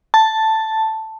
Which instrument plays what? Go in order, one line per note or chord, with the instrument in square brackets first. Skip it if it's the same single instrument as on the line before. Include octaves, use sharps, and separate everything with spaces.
[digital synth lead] A5